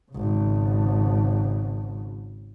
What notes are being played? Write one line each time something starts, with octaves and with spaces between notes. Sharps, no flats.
G#1 C#3